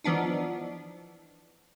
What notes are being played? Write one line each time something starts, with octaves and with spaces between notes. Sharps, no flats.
E3 F3 B3 D4 D#4